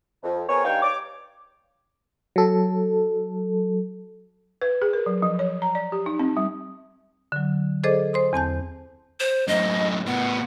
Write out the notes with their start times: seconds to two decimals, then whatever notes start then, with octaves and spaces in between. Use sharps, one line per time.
0.23 F2
0.49 B3 C4 G#4 A#4 C#5
0.64 G2 D#4 C#5 F5 G5
0.82 C#5 D6
2.36 F#3 A4
4.62 B4
4.82 G#4
4.93 A#4
5.06 F#3
5.22 F3
5.39 C#5
5.62 A#5
5.75 D5
5.92 G4
6.06 D#4
6.19 C4
6.37 G3
7.32 D3 F#3
7.84 G#4 A4 C5 D5 D#5 D6
8.13 C5 C6 D#6
8.33 E2 C4 A5 G6
9.20 C5
9.48 F#2 A2 D#5
10.07 A2 B3 F#5